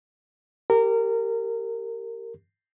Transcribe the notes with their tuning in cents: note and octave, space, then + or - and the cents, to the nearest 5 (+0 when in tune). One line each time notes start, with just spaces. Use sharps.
G4 +0 A#4 -20